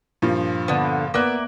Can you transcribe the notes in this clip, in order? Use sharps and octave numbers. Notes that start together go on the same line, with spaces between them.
G2 A#2 F3
D3 B3
A#3 B3 D5 E5 F#6